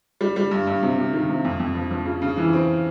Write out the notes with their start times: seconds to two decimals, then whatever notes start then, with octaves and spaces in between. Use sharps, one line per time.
0.21 G3
0.36 G3
0.51 G2
0.67 G2
0.83 C3
0.98 C3
1.13 D#3
1.29 C3
1.45 F2
1.60 F2
1.75 F3
1.91 F3
2.06 C#3
2.22 C#3
2.37 E3
2.53 C4